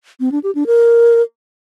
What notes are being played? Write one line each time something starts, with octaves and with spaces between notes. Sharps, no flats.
C4
D4
G4
D4
A#4